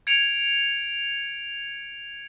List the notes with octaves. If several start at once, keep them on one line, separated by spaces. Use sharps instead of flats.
G#6 C#7 D7 F7